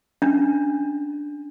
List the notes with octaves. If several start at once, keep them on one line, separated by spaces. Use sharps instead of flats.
C#4 D4